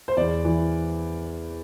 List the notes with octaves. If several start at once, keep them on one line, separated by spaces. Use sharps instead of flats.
C5
E2 D5
E3